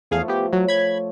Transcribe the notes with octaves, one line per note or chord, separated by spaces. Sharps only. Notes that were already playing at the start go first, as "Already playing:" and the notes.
E2 F3 A3 G#4 F5
B3 G4
F#3 C#5
B5 G#6